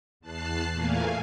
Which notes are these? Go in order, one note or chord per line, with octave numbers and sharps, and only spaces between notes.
E2 A5 F#6 C7
E2 A#2 A3 A#3 F5 G#5